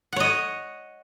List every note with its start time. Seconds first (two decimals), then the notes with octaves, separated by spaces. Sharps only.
0.13 F#5
0.16 C#5
0.20 D#5